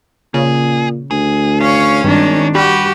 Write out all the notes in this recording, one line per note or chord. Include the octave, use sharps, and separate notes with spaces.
A#2 C#3 G#4
D2 G#4
C#4 C#5 F5
G#1 G2 D#3 D4
G3 F#4 G4 B4